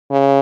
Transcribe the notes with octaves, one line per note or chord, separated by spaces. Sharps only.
C#3